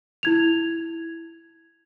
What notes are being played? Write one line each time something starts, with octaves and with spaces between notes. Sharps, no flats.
E4 G#6 F7